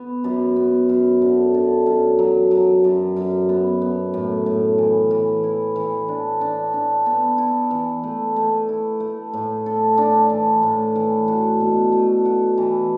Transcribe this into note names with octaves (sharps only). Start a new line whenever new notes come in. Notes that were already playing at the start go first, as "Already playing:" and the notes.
Already playing: B3
F#2
B3
F#2
D3
D3
F#2
F#3
F#3
F#2
F#2
B3
B3
A2
A2
E3
E3
E4
E3
D4
D4
D4
B3
E4
E3
A3
A3
E4
A3
A2
A4
D4
E3
A2
E3
F#4
B2
A3
F#4
E3